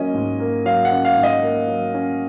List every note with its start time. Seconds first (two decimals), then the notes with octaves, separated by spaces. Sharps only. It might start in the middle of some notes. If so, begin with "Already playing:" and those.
Already playing: F#3 A#3 C#4 D#5
0.14 G#2
0.40 A#3
0.65 F#3 F5
0.85 F#5
0.92 C#4
1.05 F5
1.17 G#2
1.23 D#5
1.43 A#3
1.68 F#3
1.94 C#4